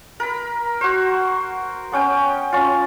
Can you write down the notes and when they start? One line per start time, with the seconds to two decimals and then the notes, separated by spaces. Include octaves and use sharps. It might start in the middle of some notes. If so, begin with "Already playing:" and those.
0.20 A#4 B5
0.81 F#4 C5
1.92 B3 C#4 G5
2.52 C#4 F4